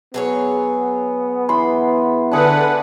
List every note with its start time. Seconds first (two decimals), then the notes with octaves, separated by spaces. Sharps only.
0.14 F#3 B3 G#4 C#5
1.49 E3 B5 C6
2.31 D3 D4 G#4 B4 F#5